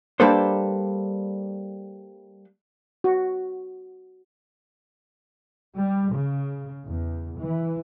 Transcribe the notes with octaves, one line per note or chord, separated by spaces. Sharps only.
G3 A#3 D4 A4 B4 C5
F#4
G3
C#3
E2
E3